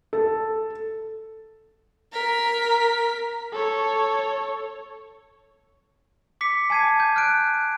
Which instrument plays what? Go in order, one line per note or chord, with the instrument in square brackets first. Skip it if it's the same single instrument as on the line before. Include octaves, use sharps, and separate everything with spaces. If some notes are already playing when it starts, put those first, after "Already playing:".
[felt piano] A4
[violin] A#4 B6
[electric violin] A4 C#5
[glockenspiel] D6 B6 C#7
G#5 A5 G#6 C7 D#7
G6
F6 F#6 D7